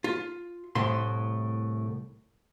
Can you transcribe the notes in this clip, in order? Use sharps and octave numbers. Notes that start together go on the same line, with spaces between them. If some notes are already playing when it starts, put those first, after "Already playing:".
F4
C2 A2 C6